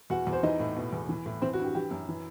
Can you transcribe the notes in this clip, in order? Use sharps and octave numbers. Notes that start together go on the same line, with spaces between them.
E2 F#4 F#5
E2
C5
E3 D#4 D#5
A2
B2
E2
E3
A2
E3 C4 C5
F#4
G2 G4
E3 G4
F#2
E3